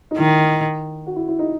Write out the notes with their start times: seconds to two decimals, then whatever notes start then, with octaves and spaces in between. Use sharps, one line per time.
0.11 D#4
0.18 D#3 E4
1.06 F#4
1.16 E4
1.28 E4
1.39 D#4